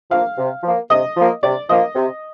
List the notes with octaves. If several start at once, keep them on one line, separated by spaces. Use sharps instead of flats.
F3 A#3 F5
C3
F3 A#3
C3 D#5
F3 A#3
C3 D5
F3 A#3 D#5
C3